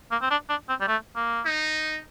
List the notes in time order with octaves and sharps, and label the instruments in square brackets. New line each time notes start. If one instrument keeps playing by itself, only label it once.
[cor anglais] A#3
C4
D4
D4
C4
G3
A3
A#3
[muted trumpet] D#4